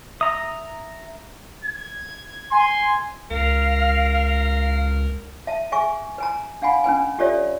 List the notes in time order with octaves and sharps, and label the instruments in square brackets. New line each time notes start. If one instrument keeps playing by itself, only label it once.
[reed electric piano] E5 [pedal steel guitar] A#5 D#6
[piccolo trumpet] G#6
[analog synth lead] G#5 [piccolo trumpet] C6
[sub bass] C#2 [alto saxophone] A#4 [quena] F5
[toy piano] E5 A5
G#4 E5 G#5 C#6
B4 G#5 A#5
D4 F5 F#5 G#5 B5
C#4 D4 B4 G#5
F4 G4 A4 C#5 D5 E5